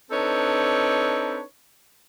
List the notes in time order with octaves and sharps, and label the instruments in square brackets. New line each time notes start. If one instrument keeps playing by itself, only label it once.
[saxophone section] C4 D4 D#4 A4 B4 C#5